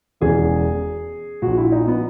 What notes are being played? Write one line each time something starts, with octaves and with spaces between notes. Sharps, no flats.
E1 E2 C#3 E3 G#4
A#1 A#2 F#4
E4
D#4
B3